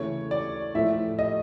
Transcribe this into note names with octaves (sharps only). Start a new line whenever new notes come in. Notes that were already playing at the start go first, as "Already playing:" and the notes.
Already playing: C#3 E3 A3 C#5
D5
A2 F3 A3 E5
D#5